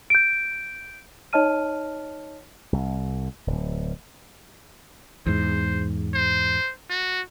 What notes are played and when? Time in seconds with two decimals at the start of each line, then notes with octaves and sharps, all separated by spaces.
0.10 G6 D7
1.33 D#4 C#5 D#5 A5 F6 D#7
2.73 C2
3.47 D1
5.26 E2 G#2 C5
6.14 C5
6.90 F#4